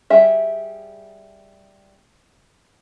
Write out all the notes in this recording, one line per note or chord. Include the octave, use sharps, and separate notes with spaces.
G3 G#4 E5